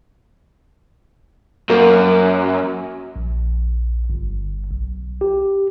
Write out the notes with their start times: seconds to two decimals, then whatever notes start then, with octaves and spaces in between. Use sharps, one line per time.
1.70 F#2 A#3
3.16 A#1
4.10 G1
4.71 B1
5.21 G4